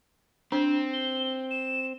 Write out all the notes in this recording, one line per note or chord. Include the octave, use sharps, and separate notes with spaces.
C4 D4 C5
G7
E7